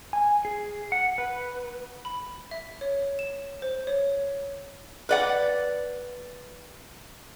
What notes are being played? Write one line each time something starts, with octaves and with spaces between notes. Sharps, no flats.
G#5
G#4
F#5
B4
B5
E5
C#5
E7
C5
C#5
B4 D5 F#5